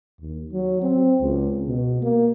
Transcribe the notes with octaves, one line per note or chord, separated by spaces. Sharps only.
D#2
F#3
C4
C#2
B2
A#3